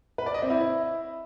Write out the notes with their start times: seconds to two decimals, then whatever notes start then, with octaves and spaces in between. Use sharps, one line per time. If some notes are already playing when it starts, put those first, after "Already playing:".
0.18 B4
0.26 D5
0.34 D#5
0.42 C4
0.50 E4